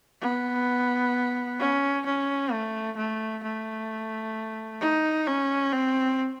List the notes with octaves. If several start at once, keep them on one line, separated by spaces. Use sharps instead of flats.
B3
C#4
C#4
A3
A3
A3
D#4
C#4
C4